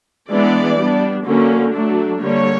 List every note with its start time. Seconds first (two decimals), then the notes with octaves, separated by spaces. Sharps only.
0.30 E3 G#3 B3 D4 D5
0.78 G3 B3 D4
1.26 D3 F#3 A#3 C#4
1.74 F#3 A3 D4
2.22 D3 G3 A#3 C#5